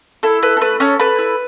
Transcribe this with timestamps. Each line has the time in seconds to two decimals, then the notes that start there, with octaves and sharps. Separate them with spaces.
0.23 E4 A4
0.43 A4 B4
0.57 A4
0.61 A3 B4
0.80 C#4 A4 C#5
1.00 A4 B4 B5
1.18 E4